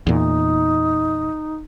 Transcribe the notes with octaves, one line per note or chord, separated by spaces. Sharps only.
E2 A#2 D#4